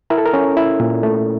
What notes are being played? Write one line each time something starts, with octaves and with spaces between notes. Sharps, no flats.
E4 A#4
A4
A#4
C#4
E4
A#2
A3